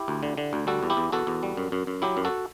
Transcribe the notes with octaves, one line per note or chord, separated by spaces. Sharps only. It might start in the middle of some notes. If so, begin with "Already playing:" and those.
Already playing: E4 G4
D2
D3
D3
D2
G3 F#4 A4
E2
E4 G4
E2
E2 F#4 A4
E2
G3
F#2
F#2
F#2
F#3 E4 G4
F#2
F#4 A4